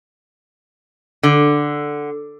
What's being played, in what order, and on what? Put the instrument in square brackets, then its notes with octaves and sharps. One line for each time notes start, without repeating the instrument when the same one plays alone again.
[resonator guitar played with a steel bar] D3